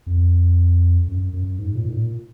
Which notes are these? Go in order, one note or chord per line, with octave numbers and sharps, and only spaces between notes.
F2
F#2
F#2
G#2
A#2
G#2
A#2